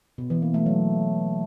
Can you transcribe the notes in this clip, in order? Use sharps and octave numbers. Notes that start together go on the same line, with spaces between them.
B2
E3
A#3
A3
F#3